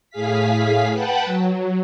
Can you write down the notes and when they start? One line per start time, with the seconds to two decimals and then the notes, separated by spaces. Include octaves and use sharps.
0.10 A2 G#4 F5 B6
0.93 B4 F#5 G5 A5 B5
1.25 F#3